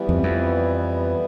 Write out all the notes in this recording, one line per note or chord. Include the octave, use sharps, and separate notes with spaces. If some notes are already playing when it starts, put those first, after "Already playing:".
Already playing: E3 G3 B3
F2
F2